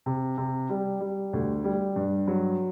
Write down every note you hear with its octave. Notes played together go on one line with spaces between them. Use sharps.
C3
C3
G3
G3
D2
G3
G2
F#3